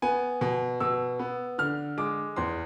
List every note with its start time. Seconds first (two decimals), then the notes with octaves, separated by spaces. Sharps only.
0.02 B3 G#5
0.41 B2
0.80 B2 E6
1.19 B3
1.58 D3 F6
1.98 G#3 D6
2.36 E2 C6